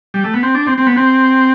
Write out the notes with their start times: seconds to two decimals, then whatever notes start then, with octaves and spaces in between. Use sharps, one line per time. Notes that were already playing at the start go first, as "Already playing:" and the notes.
0.14 G3
0.24 A3
0.34 B3
0.43 C4
0.55 D4
0.67 C4
0.78 C4
0.87 B3
0.97 C4